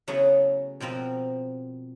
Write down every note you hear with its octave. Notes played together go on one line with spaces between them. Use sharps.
C#3 F#3 A3 B3 E4 G#4
B2 F3 C4 A#4 B4